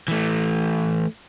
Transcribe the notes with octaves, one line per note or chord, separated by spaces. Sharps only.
E3 A3